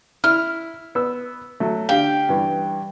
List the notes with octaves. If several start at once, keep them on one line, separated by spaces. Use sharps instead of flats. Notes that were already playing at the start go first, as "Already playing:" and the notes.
E4 F6
B3 E6
F#3 A3
D3 G4 F5 G5
G2 E3